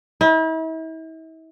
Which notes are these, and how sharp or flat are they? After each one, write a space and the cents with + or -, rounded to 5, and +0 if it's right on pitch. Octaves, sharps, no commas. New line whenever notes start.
E4 -40